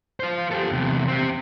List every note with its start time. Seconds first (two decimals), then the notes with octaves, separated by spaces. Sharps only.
0.20 F4 C5
0.51 G4 A4
0.71 E2 C3
1.08 C4 G4